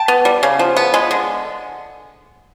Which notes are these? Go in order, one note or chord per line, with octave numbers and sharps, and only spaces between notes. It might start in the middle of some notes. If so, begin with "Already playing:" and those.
Already playing: G5 A5
B3
G3
C#3
F3
B3
G#3
D3